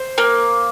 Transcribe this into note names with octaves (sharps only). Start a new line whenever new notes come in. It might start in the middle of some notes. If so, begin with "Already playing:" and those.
Already playing: C5
A#3